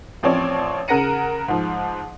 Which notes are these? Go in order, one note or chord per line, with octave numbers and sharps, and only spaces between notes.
A1 F3 C4 C#5 D5
C#3 A#4 F#5 A#6 C#7 D#7
G#2 F3